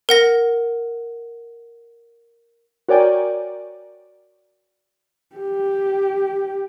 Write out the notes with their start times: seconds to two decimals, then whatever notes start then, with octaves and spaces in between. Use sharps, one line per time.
0.09 A#4 F#5 A#6
2.89 F#4 A#4 C#5 D5 G5 G#5
5.36 G4